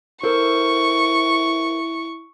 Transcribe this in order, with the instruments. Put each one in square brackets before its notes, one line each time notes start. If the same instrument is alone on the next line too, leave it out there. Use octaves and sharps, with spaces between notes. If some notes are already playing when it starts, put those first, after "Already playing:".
[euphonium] E4 [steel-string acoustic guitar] A4 A#4 C5 [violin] C#6